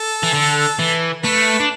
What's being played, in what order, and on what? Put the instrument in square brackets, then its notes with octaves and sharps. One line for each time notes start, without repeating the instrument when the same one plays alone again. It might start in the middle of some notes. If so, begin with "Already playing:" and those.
Already playing: [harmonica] A4
[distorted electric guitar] E3
D3
E3
[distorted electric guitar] A3 [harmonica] B4
[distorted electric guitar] D4